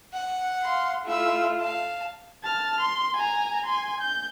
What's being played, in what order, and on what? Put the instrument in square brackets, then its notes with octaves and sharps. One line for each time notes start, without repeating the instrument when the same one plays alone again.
[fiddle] F#5
[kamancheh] F5 C6
[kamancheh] A3 F4 [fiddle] E4 E6
[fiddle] F5 A5
[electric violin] A5 F6
C6
G#5 A#5
G#5 C6
G6